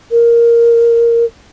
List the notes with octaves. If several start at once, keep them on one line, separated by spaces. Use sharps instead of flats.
A#4